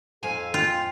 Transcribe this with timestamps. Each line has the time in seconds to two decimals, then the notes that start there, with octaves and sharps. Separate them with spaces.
0.23 F2 A4 F5 G#5
0.54 F4 G5